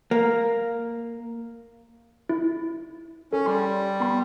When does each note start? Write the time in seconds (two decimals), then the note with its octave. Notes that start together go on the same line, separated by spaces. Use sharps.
0.11 A#3
2.29 E4
3.33 C#4 A4
3.46 G3 C6
4.00 B3 B5 C6